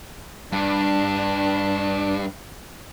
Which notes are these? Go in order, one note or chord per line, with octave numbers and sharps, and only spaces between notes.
G2 D4